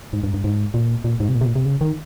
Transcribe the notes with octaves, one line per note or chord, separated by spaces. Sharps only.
G#2
G2
G2
G#2
A#2
A#2
G#2
C3
A#2
C3
A#2
C3
C#3
D#3